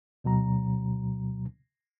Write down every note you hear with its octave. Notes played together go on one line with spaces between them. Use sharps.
D2 B2 F#3 A#5